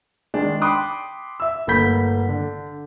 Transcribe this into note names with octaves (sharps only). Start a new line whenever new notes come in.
D#3 G#3 D4
G5 B5 C6 D6 D#6 F#6
E5 E6
G1 A3 A#3 B5 G6 B6
D3